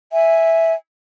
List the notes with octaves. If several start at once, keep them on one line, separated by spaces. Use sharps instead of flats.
E5 G#5